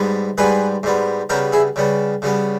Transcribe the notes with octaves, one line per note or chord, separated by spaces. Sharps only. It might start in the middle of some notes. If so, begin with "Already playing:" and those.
Already playing: G#2 G3 B3
G#2 G3 B3 G#4 B4
G#2 G3 B3
C#3 G3 B3 G4 A#4
E4 G#4
C#3 G3 B3
C#3 G3 B3